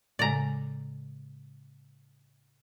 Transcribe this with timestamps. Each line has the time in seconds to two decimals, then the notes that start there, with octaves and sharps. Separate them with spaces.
0.19 A2 C#3 G#3 D5 A#5